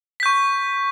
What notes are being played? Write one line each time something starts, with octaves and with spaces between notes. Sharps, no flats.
C#6 G6 B6